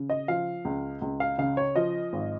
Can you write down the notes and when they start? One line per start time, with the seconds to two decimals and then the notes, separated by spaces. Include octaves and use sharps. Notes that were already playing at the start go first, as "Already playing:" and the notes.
Already playing: C#3
0.10 D#5
0.28 F3 F5
0.65 C#2
1.02 C#2
1.20 F5
1.38 C#3 F5
1.57 C#5
1.76 F3 D#5
2.13 G#1